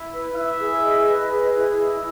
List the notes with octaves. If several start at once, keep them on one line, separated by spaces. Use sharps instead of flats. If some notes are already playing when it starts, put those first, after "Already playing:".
Already playing: E4
B4
E4 E5
G#4
D#5
B4
G#4
E4
D#5 E5